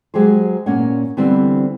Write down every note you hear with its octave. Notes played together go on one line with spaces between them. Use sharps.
F#3 G#3 G4 G#4 C5
A#2 A#3 C#4 C#5 F#5
D3 E3 G3 B3 C4